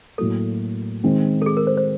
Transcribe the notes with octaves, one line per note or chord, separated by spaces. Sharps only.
A2 F#3 A#3 A4
D#3 G#3 C4
A4
G#4
A#4
C5
C5